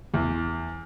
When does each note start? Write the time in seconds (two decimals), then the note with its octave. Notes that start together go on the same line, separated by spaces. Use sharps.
0.14 E2